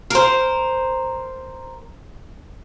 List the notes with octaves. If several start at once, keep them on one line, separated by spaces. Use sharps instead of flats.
A#4 C5